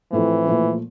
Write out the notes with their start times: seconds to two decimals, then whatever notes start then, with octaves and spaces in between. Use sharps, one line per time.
0.12 A2 E3 F3 A3 C4
0.46 A#2 F3 A3